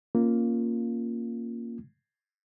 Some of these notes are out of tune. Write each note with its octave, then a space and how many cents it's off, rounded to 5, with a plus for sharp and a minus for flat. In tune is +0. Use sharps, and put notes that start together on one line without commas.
A#3 +0 C#4 -10 F4 -5